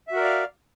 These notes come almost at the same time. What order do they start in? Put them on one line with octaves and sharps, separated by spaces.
E5 F#4 A#4 D5 F5